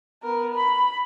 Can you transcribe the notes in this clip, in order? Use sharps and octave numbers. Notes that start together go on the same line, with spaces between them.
B3 A#4
B5